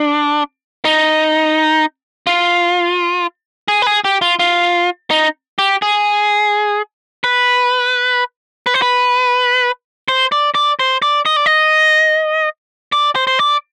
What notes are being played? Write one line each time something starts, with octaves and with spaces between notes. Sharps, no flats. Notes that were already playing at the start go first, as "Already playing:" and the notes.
Already playing: D4
D#4
F4
G#4
B4
G#4
G4
F4
F4
D#4
G4
G#4
B4
B4
C5
B4
C5
D5
D5
C5
D5
D#5
D5
D#5
D5
C5
C5
D5